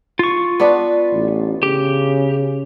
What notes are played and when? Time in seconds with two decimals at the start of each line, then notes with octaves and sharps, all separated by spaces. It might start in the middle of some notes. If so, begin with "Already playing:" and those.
0.19 F4 C#6
0.60 B3 D4 B4
1.12 A1
1.63 C#3 G4